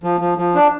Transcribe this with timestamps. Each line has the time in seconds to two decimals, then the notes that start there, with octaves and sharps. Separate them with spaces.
0.03 F3
0.21 F3
0.38 F3
0.55 D4